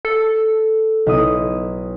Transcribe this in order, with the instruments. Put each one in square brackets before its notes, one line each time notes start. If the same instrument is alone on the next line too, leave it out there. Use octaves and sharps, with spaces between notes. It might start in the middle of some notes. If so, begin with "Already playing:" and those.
[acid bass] A4
[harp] B1 E4 D#6